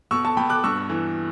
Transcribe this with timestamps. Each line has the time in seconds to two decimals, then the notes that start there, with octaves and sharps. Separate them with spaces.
0.11 B2 C#6 E6
0.25 A5 C#6
0.37 B2 G5 B5
0.50 D6 F#6
0.64 G2 C#6 E6
0.90 E3